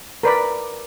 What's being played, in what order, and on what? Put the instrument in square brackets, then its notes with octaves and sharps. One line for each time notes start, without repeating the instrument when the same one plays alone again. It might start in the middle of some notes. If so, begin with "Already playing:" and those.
[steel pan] A#4 B4 D5 B5